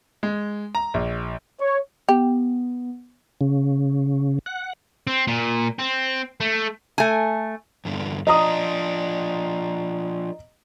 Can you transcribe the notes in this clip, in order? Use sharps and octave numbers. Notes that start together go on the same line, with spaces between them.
G#3
A#5
A#1
C#5
B3 G4
C#3
F#5
C4
A#2
C4
A3
A3 G#5
E2 G2 D3
F3 D4 D#5 A#5 D#6